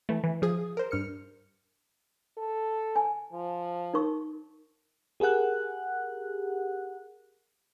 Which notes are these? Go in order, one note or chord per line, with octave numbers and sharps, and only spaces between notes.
E3 A3
E3
F3 G#4 D#6
A#4 C5
G2 F6 C#7
A4
G#5
F3
D#4 A#4 C#6
G4 G#4 A#4 F#5 F#6